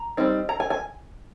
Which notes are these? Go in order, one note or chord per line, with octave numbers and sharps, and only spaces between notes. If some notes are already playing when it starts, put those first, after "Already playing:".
Already playing: A#5
G3 C4 D#4
A#5
G#5
G#5